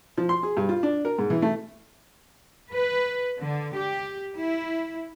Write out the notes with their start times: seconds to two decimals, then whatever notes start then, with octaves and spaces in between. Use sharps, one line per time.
0.17 F3
0.29 C6
0.43 G#4
0.57 G2
0.69 F4
0.83 D4
1.05 A#4
1.18 G#2
1.30 E3
1.42 A3
2.72 B4
3.41 D3
3.77 G4
4.39 E4